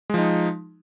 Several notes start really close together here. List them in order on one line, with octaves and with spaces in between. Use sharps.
G#3 F3 D#4